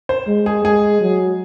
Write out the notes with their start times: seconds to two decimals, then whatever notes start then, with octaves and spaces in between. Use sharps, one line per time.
0.09 C5
0.27 G#3
0.46 G#4
0.64 G#3 G#4
1.01 F#3